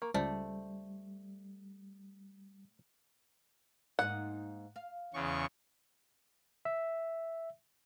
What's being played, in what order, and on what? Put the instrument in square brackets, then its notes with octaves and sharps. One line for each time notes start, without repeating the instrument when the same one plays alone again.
[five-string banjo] A#3 [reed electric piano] C#6
[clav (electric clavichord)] C#2 [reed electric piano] G3 [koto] A3 [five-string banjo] C5 D5
[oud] G#2 A#3 D#4 [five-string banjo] F#5
[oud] F5
[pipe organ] E2 C#3 C#6
[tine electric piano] E5